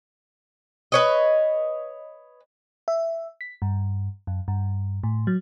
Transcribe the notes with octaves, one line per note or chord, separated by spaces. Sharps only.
B4 C#5 D#5
E5
B6
G2
F#2
G2
A2
F#3